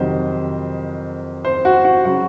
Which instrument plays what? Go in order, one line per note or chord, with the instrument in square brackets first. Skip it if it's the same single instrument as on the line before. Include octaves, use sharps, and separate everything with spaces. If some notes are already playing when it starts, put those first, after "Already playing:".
Already playing: [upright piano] F2 C3 D#3 F#3 C5
C5
F#4
F#4
C#3 F#3 F#4